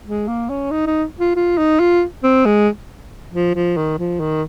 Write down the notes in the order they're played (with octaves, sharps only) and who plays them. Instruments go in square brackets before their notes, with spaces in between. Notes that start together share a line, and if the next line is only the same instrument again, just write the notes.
[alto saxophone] G#3
A#3
C#4
D#4
D#4
F4
F4
D#4
F4
C4
G#3
F3
F3
D#3
F3
D#3